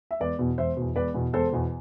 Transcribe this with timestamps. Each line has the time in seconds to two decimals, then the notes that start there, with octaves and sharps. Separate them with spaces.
0.11 E5
0.20 E1 B4 D5
0.39 E2 B2
0.58 E1 C5 E5
0.77 E2 B2
0.96 E1 B4 D5
1.14 E2 B2
1.33 E1 A4 C5
1.52 E2 B2